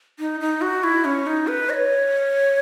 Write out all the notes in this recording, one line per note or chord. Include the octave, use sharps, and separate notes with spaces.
D#4
D#4
F#4
E4
C#4
D#4
B4
D#5
C#5